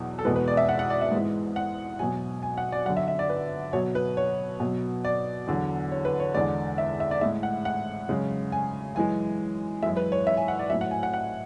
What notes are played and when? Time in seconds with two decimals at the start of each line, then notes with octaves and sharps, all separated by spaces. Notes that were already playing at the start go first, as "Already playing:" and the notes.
Already playing: E2 B2 F#3
0.19 A4
0.25 E2 B2 G#3 B4
0.36 B4
0.48 D5
0.57 E5
0.69 F#5
0.79 F#5
0.90 D5
1.01 E5
1.12 G#2 E3 G#3
1.56 F#5
1.99 B2 F#3 G#5
2.43 G#5
2.58 F#5
2.72 D5
2.86 F#2 F#5
2.89 D3 F#3
2.97 E5
3.08 E5
3.19 D5
3.29 B4
3.73 B2 F#3 C#5
3.95 B4
4.17 C#5
4.60 B2 F#3
5.05 D5
5.47 E2 D3 F#3
5.92 C#5
6.05 B4
6.20 C#5
6.35 E2 D3 G#3 D5
6.78 E5
7.00 E5
7.11 D5
7.21 A2 G#3 E5
7.43 F#5
7.65 F#5
8.09 F#2 C#3 G#3
8.52 G#5
8.95 F#2 E3 G#3 G#5
9.83 F#2 E3 G#3 E5
9.97 B4
10.12 C#5
10.27 E5
10.37 G#5
10.48 F#5
10.59 D5
10.70 F#3 E5
10.73 A2
10.81 F#5
10.91 G#5
11.03 F#5
11.13 F#5